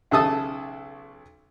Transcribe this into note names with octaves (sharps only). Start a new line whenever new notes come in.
B1 C#3 A4 E5 A5 D#6